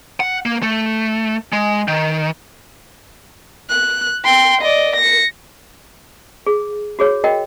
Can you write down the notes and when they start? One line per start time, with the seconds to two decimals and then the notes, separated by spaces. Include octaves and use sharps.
0.20 F#5
0.46 A#3
0.63 A3
1.53 G#3
1.88 D#3
3.70 F#6
4.24 G5 C6
4.62 D5 D#5
4.96 A#6 C#7
6.46 G#4
6.99 F#4 G#4 C#5
7.24 F#4 A#4 D#5 G5